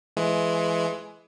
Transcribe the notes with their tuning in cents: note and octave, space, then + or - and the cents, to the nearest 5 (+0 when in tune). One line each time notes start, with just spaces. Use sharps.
E3 +25 G#3 +25